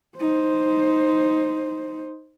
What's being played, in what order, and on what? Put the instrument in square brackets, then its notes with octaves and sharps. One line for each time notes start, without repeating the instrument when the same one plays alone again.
[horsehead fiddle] D#4 C5